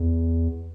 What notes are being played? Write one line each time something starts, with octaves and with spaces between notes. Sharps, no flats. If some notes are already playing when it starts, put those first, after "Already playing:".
Already playing: E2